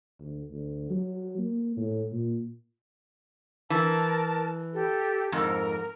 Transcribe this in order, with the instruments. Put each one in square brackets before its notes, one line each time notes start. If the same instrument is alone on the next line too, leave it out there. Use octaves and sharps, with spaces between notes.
[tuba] D2
D2
F#3
A#3
A2
A#2
[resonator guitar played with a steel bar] E3 [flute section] A#4 A5
[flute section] G4 A4
[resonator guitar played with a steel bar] F2 G#2 [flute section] A#4